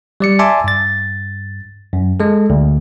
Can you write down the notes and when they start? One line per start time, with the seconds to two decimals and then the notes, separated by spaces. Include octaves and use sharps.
0.20 G3 D5 C#7
0.39 D5 E5 G#5 A5 C6 D6
0.64 G2 A6
1.93 F#2
2.20 G#3 A4
2.50 D2